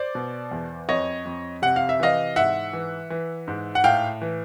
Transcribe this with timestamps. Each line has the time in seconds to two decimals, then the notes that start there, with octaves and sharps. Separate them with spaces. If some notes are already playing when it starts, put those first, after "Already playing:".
Already playing: C5 D5
0.15 B2
0.51 E2
0.89 F2 C#5 D#5
1.25 F2
1.62 C3 F#5
1.76 F5
1.89 E5
2.00 E3 D#5 F5
2.36 G#2 E5 F#5
2.73 E3
3.10 E3
3.48 G#2
3.75 F#5
3.84 A2 F5 G5
4.22 E3